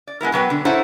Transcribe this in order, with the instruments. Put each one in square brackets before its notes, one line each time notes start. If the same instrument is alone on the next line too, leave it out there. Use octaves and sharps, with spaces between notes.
[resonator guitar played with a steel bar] D5
G#3 B3 E4 A#4
B2 F#3 B4 G5
D3
D#4 E4 A4 C5 C#5 F#5